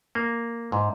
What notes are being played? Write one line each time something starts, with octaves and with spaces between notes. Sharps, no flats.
A#3
G#2